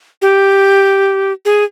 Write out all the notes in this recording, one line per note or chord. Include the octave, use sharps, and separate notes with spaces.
G4
G#4